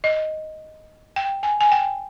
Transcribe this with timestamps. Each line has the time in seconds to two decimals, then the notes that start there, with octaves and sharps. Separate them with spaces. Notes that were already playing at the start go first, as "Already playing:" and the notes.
0.04 D#5
1.16 G5
1.43 G#5
1.61 G#5
1.72 G5